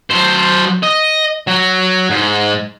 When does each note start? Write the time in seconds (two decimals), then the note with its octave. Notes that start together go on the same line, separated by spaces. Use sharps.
0.10 F#3 C5
0.83 D#5
1.47 F#3
2.10 G#2